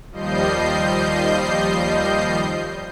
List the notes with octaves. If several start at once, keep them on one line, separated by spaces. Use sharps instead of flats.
D#2 F3 G3 D#5 G6 C7